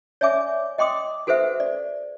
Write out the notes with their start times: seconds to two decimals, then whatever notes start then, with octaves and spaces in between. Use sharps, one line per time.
0.21 C#5 D5 E5 G#5 D6
0.78 D#5 G5 C6 D6 D#6
1.27 F#4 A4 B4 C5 E5 F#5
1.60 D5